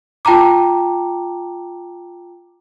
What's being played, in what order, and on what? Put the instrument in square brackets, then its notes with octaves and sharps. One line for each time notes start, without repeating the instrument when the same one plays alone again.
[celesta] F4 G5 A5 A#5 D6